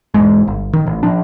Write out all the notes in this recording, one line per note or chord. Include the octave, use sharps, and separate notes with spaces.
E1 E2 G#2 G#3
G1
D#3
A1
F3 D4